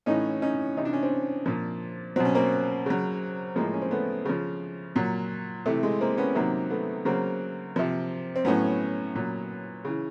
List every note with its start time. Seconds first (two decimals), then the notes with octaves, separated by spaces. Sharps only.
0.06 A2 E3 C#4 D#4
0.42 C#4 D#4
0.77 C3 E3 D#4
0.85 D4
0.93 C#4
1.02 C4 D4
1.46 A#2 F3
2.16 B2 F#3 C4
2.25 C#4
2.35 A#3 C4
2.86 C#3 F#3
3.56 A2 F3 G#3 A#3
3.74 C#4
3.82 C4
3.91 A3 B3
4.25 C#3 F3
4.96 A#2 F#3
5.66 C3 E3 A3
5.83 G#3
6.01 A#3 C4
6.18 B3 C#4
6.35 C3 D#3 F#3 A#3 C4
6.70 A3 B3
7.05 C#3 F#3 A#3 C4
7.76 C3 F3
8.36 C4
8.45 A2 F#3 B3 C#4
9.15 A#2 F#3
9.84 C#3 E3